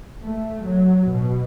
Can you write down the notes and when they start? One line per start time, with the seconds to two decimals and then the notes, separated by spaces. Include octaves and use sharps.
0.24 A3
0.64 F#3
1.12 B2